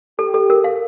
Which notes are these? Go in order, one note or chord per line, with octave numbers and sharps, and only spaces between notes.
G4 A4
A4
A#4
F5